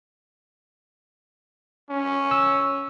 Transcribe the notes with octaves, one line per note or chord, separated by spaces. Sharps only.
C#4
E6